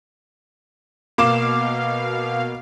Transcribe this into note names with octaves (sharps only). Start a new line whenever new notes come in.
B2 A#3 F5 D6 E7